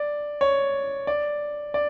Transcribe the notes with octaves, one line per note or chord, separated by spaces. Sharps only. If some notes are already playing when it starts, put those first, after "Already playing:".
Already playing: D5
C#5
D5
D5